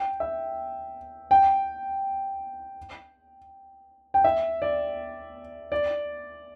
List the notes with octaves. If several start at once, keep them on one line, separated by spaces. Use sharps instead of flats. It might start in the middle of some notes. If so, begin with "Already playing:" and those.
Already playing: G5
E5
G5
G5
E5
D5
D5